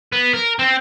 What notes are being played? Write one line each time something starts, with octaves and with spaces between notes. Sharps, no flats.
B3
A#4
C4